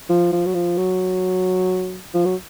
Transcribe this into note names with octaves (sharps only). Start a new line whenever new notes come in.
F3
F3
F#3
F3
F#3
F3
F#3